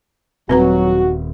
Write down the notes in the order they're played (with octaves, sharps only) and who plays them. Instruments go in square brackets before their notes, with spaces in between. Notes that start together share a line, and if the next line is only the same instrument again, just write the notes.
[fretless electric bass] D#1 [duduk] F#3 [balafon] C4 B4 A#5 [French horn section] F#4